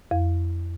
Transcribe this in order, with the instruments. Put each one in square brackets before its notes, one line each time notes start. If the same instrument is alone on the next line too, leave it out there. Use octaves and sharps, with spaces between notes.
[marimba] F2